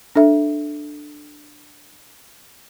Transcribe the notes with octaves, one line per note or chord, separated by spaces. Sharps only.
D4 A4 E5